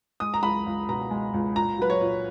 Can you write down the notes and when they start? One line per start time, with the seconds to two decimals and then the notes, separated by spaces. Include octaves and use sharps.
0.20 G#3 D#6
0.34 A#5
0.43 C#2 B5
0.66 C#2
0.89 B2 A#5
1.11 G#3
1.34 C#2
1.56 A#2 A#5
1.78 F#3 B4
1.90 C#5
2.01 A#2